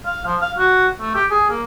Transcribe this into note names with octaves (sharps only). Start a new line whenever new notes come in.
F5
F3
F5
F#4
A3
G4
G#4
A#3